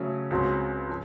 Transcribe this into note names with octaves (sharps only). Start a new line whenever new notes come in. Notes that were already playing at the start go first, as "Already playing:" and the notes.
Already playing: C#3 F#3 A3 C#4
C#2 C#3 F#3 C4 F#4
F3